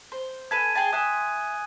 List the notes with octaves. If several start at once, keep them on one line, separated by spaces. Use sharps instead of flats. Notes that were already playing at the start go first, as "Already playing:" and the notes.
C5
A4 B4 G#5 G#6 D#7
G#4 G5 A5
E5 G#5 C6 D#6 F#6